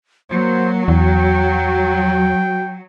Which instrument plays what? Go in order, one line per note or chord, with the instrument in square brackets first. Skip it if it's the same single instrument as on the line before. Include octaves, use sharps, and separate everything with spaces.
[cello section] F#3 [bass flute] A#3 [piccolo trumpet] C5
[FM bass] E2 [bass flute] F#4 [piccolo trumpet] G5